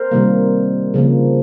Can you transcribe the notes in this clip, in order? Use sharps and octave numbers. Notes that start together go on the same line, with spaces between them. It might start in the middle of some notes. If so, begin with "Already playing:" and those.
Already playing: A#4 C5
C3 D#3 G3 A#3
C#3 F3 A#3